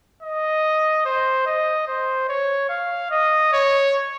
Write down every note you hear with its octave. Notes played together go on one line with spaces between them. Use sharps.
D#5
C5
D#5
C5
C#5
F5
D#5
C#5